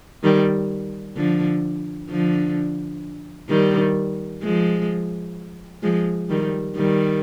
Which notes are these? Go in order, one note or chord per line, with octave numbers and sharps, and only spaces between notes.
D#3 G3
D3 F3
D3 F3
D#3 G3
F3 G#3
F3 G#3
D#3 G3
D#3 G3